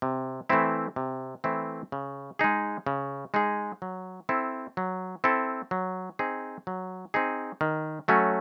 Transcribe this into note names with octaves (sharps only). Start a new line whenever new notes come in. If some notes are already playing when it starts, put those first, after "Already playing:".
C3
E3 A3 C4 E4
C3
E3 A3 C4 E4
C#3
G#3 D#4 G#4
C#3
G#3 D#4 G#4
F#3
C4 E4 A4
F#3
C4 E4 A4
F#3
C4 D#4 G#4
F#3
C4 D#4 G#4
D#3
F#3 A3 C#4 F#4